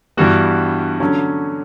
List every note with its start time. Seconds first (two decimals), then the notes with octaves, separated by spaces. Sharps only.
0.17 G2 E3 G3 B3 F#4
1.00 D3 F#3 C#4